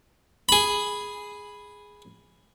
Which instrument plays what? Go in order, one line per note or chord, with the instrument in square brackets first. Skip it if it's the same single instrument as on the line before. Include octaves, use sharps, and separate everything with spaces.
[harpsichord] G#4 B5